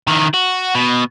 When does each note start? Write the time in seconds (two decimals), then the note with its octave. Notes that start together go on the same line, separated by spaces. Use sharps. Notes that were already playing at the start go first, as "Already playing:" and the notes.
0.07 D#3 E3
0.34 F#4
0.75 B2